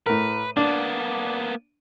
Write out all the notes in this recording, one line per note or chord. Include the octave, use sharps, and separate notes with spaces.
A2 A#4 B4
A#3 B3 D4